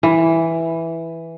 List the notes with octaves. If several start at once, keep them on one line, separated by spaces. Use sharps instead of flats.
E3